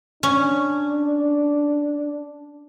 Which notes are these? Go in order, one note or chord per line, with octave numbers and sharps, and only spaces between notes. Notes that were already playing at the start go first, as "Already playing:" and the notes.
C#4 D4